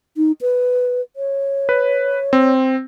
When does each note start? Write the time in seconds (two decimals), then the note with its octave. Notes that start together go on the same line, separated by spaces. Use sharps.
0.17 D#4
0.41 B4
1.16 C#5
1.69 B4
2.33 C4